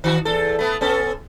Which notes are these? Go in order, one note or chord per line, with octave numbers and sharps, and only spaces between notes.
D#3 F#4
E2 A4
A3 B3
B3 C#4 A4